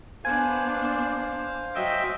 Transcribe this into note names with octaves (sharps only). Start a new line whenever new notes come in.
B3 D4 C5 F5 G#5
F#3 D#5 E5 G5